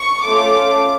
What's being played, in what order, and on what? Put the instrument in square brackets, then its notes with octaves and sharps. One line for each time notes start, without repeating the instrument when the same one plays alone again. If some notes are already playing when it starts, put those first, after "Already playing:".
Already playing: [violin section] C#6
A3 C#4 F4 A4 D6